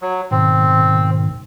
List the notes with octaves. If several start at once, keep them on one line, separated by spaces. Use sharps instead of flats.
F#3
G#2 B2 D#3 C4